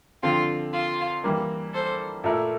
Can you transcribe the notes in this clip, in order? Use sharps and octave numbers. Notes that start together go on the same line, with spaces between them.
D3 F3 C4 F4
F4
E3 G3 A#3
A4 C5
A#2 A3 E4 A#4